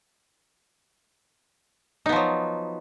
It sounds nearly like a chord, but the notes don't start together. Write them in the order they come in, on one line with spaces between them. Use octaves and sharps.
D#4 B3 F3 F#3